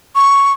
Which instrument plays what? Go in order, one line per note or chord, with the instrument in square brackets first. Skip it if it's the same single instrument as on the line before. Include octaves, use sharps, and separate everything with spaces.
[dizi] C#6